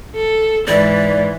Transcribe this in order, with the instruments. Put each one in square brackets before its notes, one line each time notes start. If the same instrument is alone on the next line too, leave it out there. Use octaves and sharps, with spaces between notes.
[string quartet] A4
[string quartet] G#2 E3 [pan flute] D5